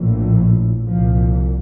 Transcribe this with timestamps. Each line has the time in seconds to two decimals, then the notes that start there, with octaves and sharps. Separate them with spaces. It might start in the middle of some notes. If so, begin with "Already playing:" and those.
Already playing: A#1 A2
0.88 C2 A#2 F3